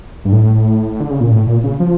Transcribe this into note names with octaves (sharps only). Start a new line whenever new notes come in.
G2
A2
D3
C#3
A#2
A2
A#2
C#3
F3